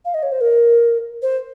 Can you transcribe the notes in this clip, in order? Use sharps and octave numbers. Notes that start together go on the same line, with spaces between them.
F5
D#5
C#5
C5
A#4
C5